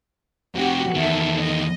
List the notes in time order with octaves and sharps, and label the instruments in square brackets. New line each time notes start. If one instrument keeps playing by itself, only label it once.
[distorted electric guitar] F2 C3 [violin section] F#4 G4
[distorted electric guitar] E2 D#3 [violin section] A4 E5
[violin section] D#5